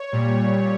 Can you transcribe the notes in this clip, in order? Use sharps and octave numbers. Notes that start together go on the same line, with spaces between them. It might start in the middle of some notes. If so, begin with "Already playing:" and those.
Already playing: C#5
A#2 G3